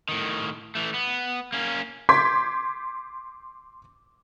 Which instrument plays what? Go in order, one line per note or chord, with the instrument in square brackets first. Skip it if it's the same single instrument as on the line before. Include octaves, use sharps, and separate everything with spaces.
[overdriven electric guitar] A2 D#3
E3 A3
B3
A#3 C#4
[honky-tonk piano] C6 D6 G6 G#6 B6